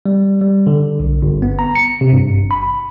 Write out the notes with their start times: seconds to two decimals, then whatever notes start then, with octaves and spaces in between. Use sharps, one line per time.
0.06 G3
0.41 G3
0.67 D3
1.00 B1
1.22 G1
1.42 B3
1.59 A#5
1.75 C#7
2.01 C3
2.13 G2
2.35 G#1
2.51 B5